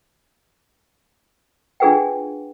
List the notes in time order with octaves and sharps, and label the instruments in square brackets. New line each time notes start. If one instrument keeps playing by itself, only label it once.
[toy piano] D4 F4 G#4 B4 F#5 G5